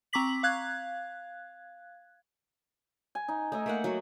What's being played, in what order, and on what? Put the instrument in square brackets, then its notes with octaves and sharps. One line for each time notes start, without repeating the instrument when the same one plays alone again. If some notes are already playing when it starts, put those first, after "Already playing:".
[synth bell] C4 A#5 C#6 D6 B6 F#7
F5 F#6 G#6
[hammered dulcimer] G#5
D#4
[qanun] A3 [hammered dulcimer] D#4 D#5 E5
[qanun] A3 A#3 F#5
F#3 F#4